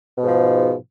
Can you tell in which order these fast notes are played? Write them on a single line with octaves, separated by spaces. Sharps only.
B2 G#2 F3